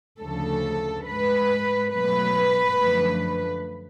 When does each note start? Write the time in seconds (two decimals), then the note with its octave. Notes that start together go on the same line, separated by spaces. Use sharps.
0.20 D2 C#3 F3 A4
1.06 G#2 G#3 B4
1.91 B2 F#3 A3 B4
2.77 F#2 D3 F3 A3